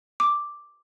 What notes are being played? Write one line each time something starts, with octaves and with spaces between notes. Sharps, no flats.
D6